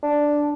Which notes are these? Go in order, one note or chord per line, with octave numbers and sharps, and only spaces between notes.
D4